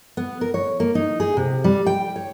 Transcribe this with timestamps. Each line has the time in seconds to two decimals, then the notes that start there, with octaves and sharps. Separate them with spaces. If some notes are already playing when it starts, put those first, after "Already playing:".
0.17 B3
0.41 A#4
0.54 C#5
0.80 A#3
0.95 D#4
1.20 G#4
1.37 C3
1.64 G3
1.86 G5
2.16 C#5